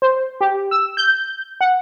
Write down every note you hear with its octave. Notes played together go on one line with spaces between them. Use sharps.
C5
G4
E6
G6
F#5